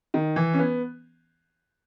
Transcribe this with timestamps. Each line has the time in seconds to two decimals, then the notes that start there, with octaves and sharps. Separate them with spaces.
0.14 D#3
0.36 E3
0.53 C#4
0.59 B3